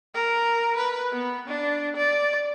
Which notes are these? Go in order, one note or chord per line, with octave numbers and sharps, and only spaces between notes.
A#4
B4
B3
D4
D5